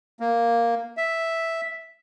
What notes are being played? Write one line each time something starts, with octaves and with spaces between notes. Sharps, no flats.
A#3
E5